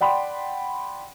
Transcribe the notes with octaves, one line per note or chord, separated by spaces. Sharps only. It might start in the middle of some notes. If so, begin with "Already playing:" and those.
D5 F#5 G5 B5 C6